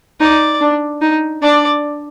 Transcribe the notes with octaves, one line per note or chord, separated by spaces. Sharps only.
D#4 D5
D4
D#4
D4 D5